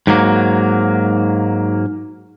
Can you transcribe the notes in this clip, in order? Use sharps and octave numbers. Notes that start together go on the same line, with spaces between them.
G#2 F#3 A#3